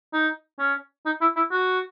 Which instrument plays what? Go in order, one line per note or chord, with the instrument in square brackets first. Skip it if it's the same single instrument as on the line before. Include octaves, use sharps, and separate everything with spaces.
[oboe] D#4
C#4
D#4
E4
E4
F#4